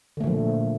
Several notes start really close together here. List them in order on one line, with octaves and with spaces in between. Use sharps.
D3 A3 A#2 F3